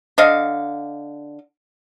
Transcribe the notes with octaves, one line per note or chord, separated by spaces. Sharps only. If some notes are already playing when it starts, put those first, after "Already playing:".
D3 D#5 F5